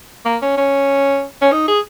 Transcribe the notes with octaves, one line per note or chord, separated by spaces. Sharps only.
A#3
C#4
C#4
C#4
D#4
G#4